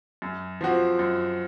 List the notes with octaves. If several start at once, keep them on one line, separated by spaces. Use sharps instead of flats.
F#2
F3 C4 F#4
F#2